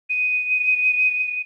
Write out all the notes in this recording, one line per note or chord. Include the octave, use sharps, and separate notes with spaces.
D#7